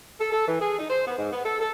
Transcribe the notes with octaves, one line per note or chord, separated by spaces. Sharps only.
A4
A4
E3
G#4
D#4
C5
B3
G#2
B3
A4
A4